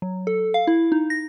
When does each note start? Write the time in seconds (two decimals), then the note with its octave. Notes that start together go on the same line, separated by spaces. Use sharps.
0.02 F#3
0.27 A4
0.54 F5
0.67 E4
0.92 D#4
1.10 A#6